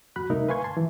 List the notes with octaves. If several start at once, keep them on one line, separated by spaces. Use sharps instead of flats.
F2 F#4 B5 F#6
C2 A3 D#4 A#4 E5
B4 F5 G#5 C6 C#6 G#6
A5 C6
E3